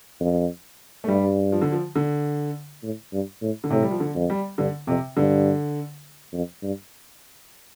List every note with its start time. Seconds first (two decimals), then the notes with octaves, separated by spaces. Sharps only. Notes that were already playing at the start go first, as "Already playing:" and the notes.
0.20 F2
1.04 A3
1.08 G2 G3
1.52 F3
1.62 D3
1.72 F3
1.96 D3
2.83 A2
3.13 G2
3.42 A2
3.64 D3
3.70 A2 C3
3.83 G3
3.91 F3
4.00 D3
4.15 F2
4.30 G3
4.58 G2 D3
4.87 F2 C3
5.17 G2 D3
6.33 F2
6.63 G2